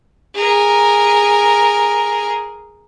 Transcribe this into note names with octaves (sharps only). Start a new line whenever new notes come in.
G#4 A#4